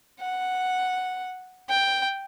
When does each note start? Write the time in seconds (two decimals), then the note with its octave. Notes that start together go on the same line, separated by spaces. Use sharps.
0.20 F#5
1.69 G5